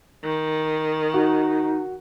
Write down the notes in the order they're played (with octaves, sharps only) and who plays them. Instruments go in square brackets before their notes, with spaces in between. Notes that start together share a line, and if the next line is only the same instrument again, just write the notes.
[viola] D#3
[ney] D#4 [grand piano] F#4